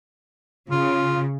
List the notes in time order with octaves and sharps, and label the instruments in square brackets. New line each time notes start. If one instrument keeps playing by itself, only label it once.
[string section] C#3 [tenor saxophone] F4